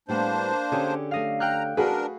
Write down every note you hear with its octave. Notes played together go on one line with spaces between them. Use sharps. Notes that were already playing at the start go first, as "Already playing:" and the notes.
A2 G3 A#3 B3 D4 C5
D3 C#4 G4 G#4
A3 D#5 F5
G5 A#5 F6 F#6
D4 F#4 G#4 A#4 B4